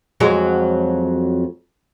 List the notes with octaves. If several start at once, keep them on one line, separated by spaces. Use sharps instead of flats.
F2 F#3 G#3